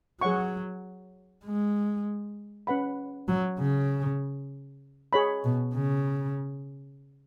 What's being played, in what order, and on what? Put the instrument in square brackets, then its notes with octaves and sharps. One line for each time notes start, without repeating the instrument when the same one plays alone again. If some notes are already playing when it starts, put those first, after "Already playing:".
[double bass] F#3 [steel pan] G#4 C#5 F#5 C#6
[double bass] G#3
[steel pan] C#4 B4 F#5 B5
[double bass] F#3
C#3
[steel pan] G#4 C#5 B5
[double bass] B2
C#3